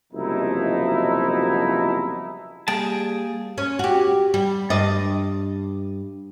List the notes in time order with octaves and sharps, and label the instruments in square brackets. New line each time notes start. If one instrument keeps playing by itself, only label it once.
[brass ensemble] F#1 C2 B2 F3 D#4 E4
[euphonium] G3 [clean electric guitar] A#3 G5 A5 [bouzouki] G#4
[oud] C#4
F#4 G4
G3
G2 D5 D#5